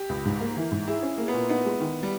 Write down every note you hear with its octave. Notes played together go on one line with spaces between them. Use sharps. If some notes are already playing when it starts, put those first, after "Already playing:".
Already playing: G4
C#2
G#2
A#3
E3
G#2
E4 G#4
C#4
A#3
B3
A#2
B3 D#4
G#3
D#3
G3